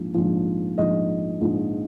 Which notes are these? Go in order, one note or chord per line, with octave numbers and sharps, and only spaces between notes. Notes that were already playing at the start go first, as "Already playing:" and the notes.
Already playing: A#1 G#2 F3
A#1 G#2 F3
A#1 G#2 F3 D#5
A#1 G#2 F3